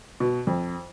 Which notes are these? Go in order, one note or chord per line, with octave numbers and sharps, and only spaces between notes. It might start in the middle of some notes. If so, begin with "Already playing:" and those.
B2
F2